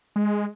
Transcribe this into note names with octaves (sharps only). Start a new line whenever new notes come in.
G#3